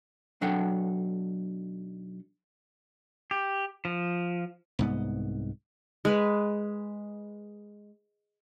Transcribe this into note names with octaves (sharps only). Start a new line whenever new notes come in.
B1 F#3 D4 A4 F#5 G5
G4
F3
C2 G#2 B3
G#3 B4